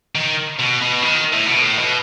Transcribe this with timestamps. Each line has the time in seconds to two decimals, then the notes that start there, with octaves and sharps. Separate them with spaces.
0.15 D#3
0.59 B2
0.81 B2
1.03 D#3
1.33 A2
1.47 B2
1.62 A2
1.78 B2